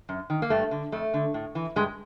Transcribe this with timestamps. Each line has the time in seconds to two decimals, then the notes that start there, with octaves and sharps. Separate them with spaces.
0.09 F#2
0.30 D#3
0.42 A#3
0.50 G2 A3
0.71 D3
0.92 F2 A3
1.14 D3
1.34 A2
1.55 E3
1.76 G2 G#3